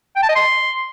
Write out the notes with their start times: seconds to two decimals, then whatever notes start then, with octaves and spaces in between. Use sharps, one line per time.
0.16 G5
0.23 A5
0.29 D#5
0.35 C6